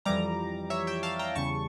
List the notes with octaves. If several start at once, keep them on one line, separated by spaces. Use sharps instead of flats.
F2 E3 G3 A#5 D6
C#5 E5
E5 G5
F5 A5
G5 A#5
E2 C#3 G3 A5 C#6